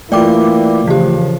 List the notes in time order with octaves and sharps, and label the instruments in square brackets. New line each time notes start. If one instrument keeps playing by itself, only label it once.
[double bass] E3 A#3 [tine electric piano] A3 F4 [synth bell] D5 G5 D6
[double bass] C#3 F3 [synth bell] E3 G4